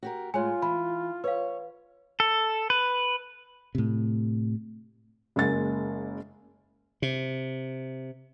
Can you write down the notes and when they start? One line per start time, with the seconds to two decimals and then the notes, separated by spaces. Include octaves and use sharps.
0.03 F#4 G4 A#4
0.34 A2 G#3 F4 C#5 G#5
0.62 E3 B5
1.24 B4 C#5 F5
2.20 A4
2.70 B4
3.75 A2 C3
5.36 F#1 G#3 A#3 A6
7.02 C3